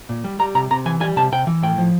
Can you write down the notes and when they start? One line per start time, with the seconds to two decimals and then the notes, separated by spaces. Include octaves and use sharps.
0.09 A#2
0.24 G3
0.39 G3 A#5
0.55 C3 A#5
0.71 C3 A#5
0.86 E3 G#5
1.00 G3 G#5
1.16 C3 A5
1.32 C3 G5
1.47 E3
1.63 A2 G5
1.78 F3